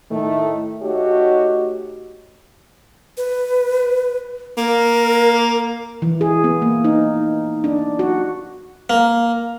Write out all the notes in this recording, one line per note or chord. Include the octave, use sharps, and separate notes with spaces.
A2 D#3 A3
A3 D#4 F#4 G4 C#5 D#5
B4
A#3 A#4
E3
G#4
B3
A#3
D#4
D4
F#4
A#3